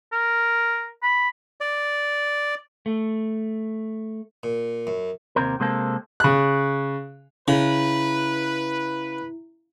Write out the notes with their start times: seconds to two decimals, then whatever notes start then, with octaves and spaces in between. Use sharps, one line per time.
0.13 A#4
1.03 B5
1.61 D5
2.86 A3
4.43 A#2
4.87 F#2
5.36 D#2 C3 C4 A#4
5.60 C3 G#3 A#3 C4 A4
6.20 C#3 F#6
7.48 C#3 E4 B4